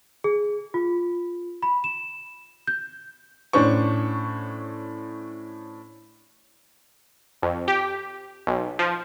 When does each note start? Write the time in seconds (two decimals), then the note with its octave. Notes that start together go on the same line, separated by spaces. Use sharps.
0.24 G#4
0.74 F4
1.63 B5
1.84 E7
2.67 G6
3.53 A2 C#4 D4 C5 C#6
7.42 F2
7.68 G4
8.47 B1
8.79 F3